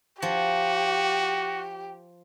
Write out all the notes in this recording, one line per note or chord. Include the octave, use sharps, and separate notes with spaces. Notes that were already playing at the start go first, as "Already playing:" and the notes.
F3 F#4 G4